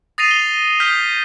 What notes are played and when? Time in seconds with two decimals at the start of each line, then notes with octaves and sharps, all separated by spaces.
0.18 D#6 A6 A#6 C7 D#7 F7
0.31 F7 G7
0.80 F6 G6 B6 G7